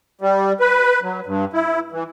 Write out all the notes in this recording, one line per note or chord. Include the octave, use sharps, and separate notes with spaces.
G3
B4
F#3
G2
E4
E3